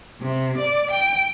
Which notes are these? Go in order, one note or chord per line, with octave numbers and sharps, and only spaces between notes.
C3
D5
G5